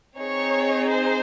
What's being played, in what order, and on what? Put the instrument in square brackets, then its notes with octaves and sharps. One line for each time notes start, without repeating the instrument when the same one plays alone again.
[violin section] C4 D#4 G#4 C#5
C5